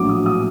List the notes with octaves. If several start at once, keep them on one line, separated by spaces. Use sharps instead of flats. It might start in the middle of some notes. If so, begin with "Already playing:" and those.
Already playing: A#1 A2 F#3 D6
D#6
D#6